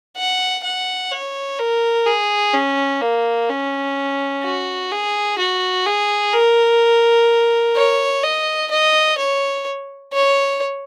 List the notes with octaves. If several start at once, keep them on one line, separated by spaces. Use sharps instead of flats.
F#5
F#5
C#5
A#4
G#4
C#4
A#3
C#4
F#4
G#4
F#4
G#4
A#4
C#5
D#5
D#5
C#5
C#5